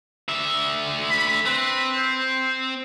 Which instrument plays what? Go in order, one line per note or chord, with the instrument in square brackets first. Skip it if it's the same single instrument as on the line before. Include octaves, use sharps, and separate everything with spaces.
[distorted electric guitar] D3 E5
[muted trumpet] B5
[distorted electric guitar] C4 [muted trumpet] B4
[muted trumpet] C5